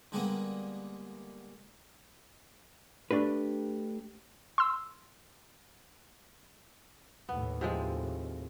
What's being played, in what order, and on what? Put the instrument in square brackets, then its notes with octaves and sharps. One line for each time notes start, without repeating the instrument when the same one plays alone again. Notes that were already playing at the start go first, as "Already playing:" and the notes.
[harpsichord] D3 G3 G#3 A#3 B3
[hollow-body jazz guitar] A3 D4 G4 B4
[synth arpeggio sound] C6 E6
[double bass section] D#2 A2 [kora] B3
[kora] C3 F3 G#3